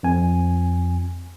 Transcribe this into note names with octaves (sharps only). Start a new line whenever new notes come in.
F2 G#5